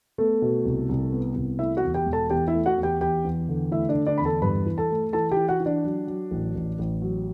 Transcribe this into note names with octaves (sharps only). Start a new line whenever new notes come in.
A3 B3 A4
B2
C2
C2
B3
C2
A3 E4 E5
F#4 F#5
E2
G4 G5
E1
A4 A5
E2 G4 G5
E4 E5
A3
F#4 F#5
E2
G4 G5
E2 G4 G5
E2
D3
A3 E4 E5
D4 D5
D3
D4 D5
E2 B5
A4 A5
G2 B4 B5
E3
A4 A5
A3
E3 A4 A5
E3 G4 G5
F#4 F#5
E3
D4 D5
F#3
F#3
A1
A1
A1
F#3